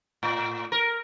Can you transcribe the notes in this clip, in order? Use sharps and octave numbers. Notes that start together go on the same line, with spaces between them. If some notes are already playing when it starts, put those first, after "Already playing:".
A2
A#4